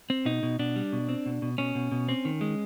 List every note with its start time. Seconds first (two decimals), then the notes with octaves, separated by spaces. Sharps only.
0.10 C4
0.25 B2 D#4
0.43 B2
0.59 B2 D4
0.76 G3
0.93 B2
1.09 C4
1.26 B2
1.42 B2
1.58 B2 C#4
1.75 B2
1.92 B2
2.09 C4
2.25 D#3
2.41 G#3